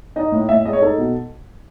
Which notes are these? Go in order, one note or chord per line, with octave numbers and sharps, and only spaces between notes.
D#4 D#5
A2
A2 E5
G#3 D#5
C#5
D#4 A4
B2